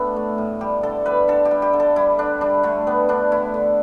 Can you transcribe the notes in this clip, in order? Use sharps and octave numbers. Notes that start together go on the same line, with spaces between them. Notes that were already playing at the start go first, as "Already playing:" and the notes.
Already playing: A2 B3 D4 E4 A4
A3
A2
G3 G4
D3 A4
G3 B4
D3 A4
G4
G3
G4
D3
A4
G3 E4
D3 D4
G3 D4
D3 A3
G3 B3
D3 D4
A3 E4
D3